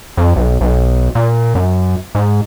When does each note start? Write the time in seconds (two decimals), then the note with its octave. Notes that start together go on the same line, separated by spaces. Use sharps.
0.17 F2
0.36 B1
0.61 B1
1.15 A#2
1.55 F#2
2.15 G#2